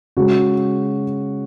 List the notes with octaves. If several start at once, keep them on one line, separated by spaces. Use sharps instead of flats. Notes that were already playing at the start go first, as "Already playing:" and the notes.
C#3 G#3 F#4